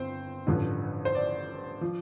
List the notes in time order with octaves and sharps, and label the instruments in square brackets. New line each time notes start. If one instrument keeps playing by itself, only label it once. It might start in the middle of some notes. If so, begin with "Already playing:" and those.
Already playing: [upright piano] G1 C4 C5
A1 G2 D3 F3
C5
D5
F3